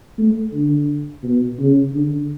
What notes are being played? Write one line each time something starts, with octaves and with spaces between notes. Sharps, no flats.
A3
D3
B2
C#3
D3